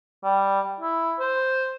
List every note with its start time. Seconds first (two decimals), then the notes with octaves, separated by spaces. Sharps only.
0.24 G3
0.80 E4
1.19 C5